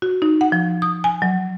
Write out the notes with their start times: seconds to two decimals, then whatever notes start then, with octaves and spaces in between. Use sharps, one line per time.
0.02 F#4
0.22 D#4
0.41 F#5
0.52 F3
0.82 D#6
1.04 G#5
1.22 F#3